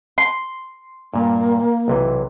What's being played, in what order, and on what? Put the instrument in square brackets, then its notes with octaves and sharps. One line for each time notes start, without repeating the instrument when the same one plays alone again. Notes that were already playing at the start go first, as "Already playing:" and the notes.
[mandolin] C6
[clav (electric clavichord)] G2 A#2 [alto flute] A#3
[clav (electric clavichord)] B1 C3 E3